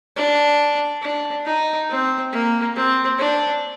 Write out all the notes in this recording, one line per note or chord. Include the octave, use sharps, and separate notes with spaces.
D4
D4
D#4
C4
A#3
C4
D4